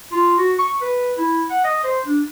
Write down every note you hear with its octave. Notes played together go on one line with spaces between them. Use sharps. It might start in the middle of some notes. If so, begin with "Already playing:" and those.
F4
F#4
C#6
B4
E4
F#5
D#5
C5
D4